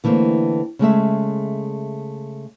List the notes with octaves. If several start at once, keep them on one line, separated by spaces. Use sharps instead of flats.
D3 E3 A3 A#3 C4
C#3 G#3 A3 E5